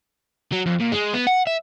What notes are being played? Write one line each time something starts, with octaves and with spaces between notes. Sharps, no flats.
F#3
F2
A#2
G#3
B3
F#5
E5